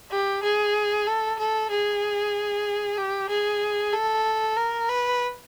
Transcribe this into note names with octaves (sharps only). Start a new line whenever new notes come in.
G4
G#4
A4
A4
G#4
G4
G#4
A4
A#4
B4